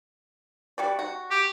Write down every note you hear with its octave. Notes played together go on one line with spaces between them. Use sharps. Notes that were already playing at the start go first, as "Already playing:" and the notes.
G3 F#4 D5
F#4
G4